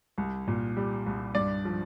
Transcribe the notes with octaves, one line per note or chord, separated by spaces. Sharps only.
C2
A#2
G3
C2
G2 D5
F3